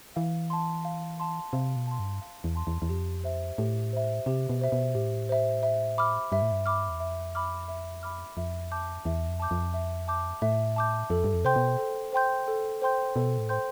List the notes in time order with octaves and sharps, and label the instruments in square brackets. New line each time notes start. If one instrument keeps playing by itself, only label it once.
[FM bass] E3 [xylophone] F5
[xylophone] A5 C6
F5
A5 C6
[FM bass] C3 [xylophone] F5
[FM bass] B2
[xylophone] A5 C6
[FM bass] G2
[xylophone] F5
[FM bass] E2
[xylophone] A5 C6
[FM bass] E2
E2
[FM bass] F2 [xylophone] G4
[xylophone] C5 E5
[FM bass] A2 [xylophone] G4
[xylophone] C5 E5
[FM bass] C3 [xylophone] G4
[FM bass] B2
[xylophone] C5 E5
[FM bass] B2
[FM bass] A2 [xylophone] G4
[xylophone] C5 E5
E5
B5 D6 F6
[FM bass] G2 [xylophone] E5
[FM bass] A2
G2
[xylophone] B5 D6 F6
[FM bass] E2
[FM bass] F2 [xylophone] E5
[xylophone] B5 D6 F6
E5
B5 D6 F6
[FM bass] F2 [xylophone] E5
[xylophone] A5 D6 G6
[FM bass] E2 [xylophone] E5
[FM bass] F2
[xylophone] A5 D6 G6
[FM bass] F2
[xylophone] E5
A5 D6 G6
[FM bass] A2 [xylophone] E5
[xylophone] A5 D6 G6
[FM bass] F2 [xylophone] A4
[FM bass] G2
F2
[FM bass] C3 [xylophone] C5 G5 C6 G6
[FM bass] B2
[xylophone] A4
C5 G5 C6 G6
A4
C5 G5 C6 G6
[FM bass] B2 [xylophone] A4
[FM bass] A2
[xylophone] C5 G5 C6 G6